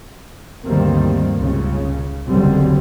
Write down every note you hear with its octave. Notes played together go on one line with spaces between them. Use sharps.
D2 G2 D#3 G3 A#3 C4
C#2 C#3
F#1 D#2 D3 F#3 G3 C4